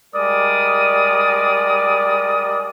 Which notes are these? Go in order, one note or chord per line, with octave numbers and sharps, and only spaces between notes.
G3 G#3 A#4 D5 D#6